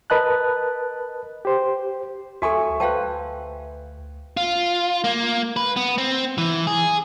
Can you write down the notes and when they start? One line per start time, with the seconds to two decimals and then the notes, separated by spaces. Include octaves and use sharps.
0.10 A#4 B4 D#5 A5 F#6
1.45 G4 C5
2.42 D2 F#4 A4 E5 G#5 C#6
2.80 D2 B4 C5 F5 G5 A5
4.37 F4
5.04 A#3
5.56 B4
5.76 B3
5.98 C4
6.38 E3
6.67 G#4